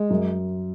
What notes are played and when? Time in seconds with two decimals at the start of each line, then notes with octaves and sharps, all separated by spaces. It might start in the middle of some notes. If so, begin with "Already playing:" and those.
Already playing: G#3
0.10 F#2